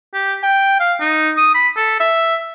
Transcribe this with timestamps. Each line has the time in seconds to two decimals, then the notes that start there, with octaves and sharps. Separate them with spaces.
0.14 G4
0.43 G5
0.80 F5
1.00 D#4
1.37 D#6
1.54 B5
1.77 A4
2.00 E5